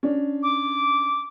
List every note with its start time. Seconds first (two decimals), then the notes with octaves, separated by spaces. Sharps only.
0.03 C#4 D4
0.43 D6